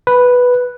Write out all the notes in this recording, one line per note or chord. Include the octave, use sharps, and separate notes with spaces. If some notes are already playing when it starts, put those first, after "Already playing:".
B4